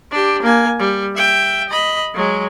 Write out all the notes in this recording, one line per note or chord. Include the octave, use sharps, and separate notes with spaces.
D4 G4
A#3 G#5
G3
E5 G5
D#5 B5
F#3 G#3